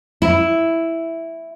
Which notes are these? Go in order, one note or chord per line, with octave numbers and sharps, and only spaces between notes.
E4